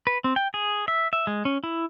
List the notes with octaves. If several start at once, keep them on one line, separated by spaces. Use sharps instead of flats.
B4
C4
G5
G#4
E5
E5
G#3
C#4
E4